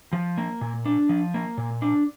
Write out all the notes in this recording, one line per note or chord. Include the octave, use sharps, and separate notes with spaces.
F3
A#3
A#2
D4
F3
A#3
A#2
D4